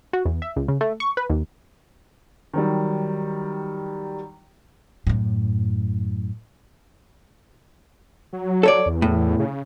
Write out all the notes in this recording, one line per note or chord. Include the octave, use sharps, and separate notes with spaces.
F#4
E2
E5
C#2
C#3
A3
C#6
B4
D#2
D#3 F#3 G3
F#2 A2
F#3
A4 C#5 D5
E2
A2
C#3